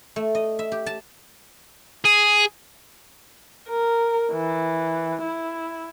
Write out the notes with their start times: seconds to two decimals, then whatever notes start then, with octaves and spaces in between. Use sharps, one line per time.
0.16 A3
0.35 D#5
0.59 E5
0.72 G4
0.86 A5
2.05 G#4
3.70 A#4
4.32 E3
5.23 E4